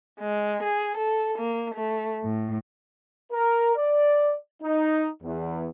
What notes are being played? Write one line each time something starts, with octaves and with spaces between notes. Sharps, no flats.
G#3
G#4
A4
A#3
A3
A2
A#4
D5
D#4
E2